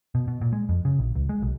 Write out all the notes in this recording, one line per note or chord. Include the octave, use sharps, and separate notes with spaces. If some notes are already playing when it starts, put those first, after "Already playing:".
B2
B2
A#2
G#3
F2
C#3
A#1
C#2
G#3
B1